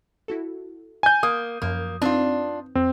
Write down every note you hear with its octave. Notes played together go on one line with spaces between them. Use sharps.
E4 F#4 A4
G#5 G6
A#3 D#6
F#2 F3 A#3
C4 D4 D#4 F4 B4
F2 C4